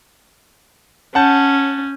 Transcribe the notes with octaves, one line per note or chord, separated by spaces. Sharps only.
C#4 F#5 A5 G6